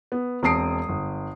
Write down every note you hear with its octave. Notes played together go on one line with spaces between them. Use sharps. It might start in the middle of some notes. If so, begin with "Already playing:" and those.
B3
E1 C4 A5 D#6 C7 D7
G1